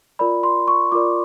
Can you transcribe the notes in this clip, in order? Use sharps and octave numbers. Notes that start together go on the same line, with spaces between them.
F4 A#4 D5 B5
C6
C#6
F4 A#4 D5 D6